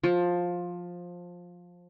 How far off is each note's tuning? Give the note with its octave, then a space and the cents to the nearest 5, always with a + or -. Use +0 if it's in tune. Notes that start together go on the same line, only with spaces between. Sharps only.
F3 +15